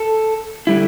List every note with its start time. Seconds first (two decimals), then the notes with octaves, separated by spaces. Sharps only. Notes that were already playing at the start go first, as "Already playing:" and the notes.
Already playing: A4
0.67 D3 G3 E4